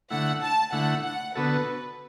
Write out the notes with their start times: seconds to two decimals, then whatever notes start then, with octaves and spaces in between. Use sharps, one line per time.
0.10 D3 A3 E4 F#5
0.41 A5
0.73 D3 A3 E4 F#5
1.04 F#5
1.35 D3 B3 F#4 A4 B4